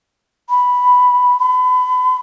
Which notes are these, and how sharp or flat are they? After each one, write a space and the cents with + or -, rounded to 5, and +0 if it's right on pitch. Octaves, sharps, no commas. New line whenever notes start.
B5 +0
B5 +30